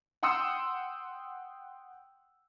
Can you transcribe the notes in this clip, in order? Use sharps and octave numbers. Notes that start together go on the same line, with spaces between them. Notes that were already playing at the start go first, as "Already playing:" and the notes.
F#5 G5 C6 D#6 E6 C#7